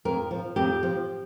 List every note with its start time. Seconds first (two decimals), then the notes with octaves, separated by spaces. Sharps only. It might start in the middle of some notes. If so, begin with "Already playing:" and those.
0.05 F2 A#4
0.31 F3
0.56 F2 G4
0.83 F3